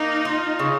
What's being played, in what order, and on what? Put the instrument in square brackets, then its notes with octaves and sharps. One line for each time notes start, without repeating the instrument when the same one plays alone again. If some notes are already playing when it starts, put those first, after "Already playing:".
Already playing: [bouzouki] A#3 [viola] D#4
[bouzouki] F4
C#3